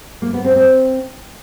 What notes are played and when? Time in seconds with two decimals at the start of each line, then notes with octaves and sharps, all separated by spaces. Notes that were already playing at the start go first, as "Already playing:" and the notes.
0.22 A#3
0.33 B3
0.44 C4
0.56 C4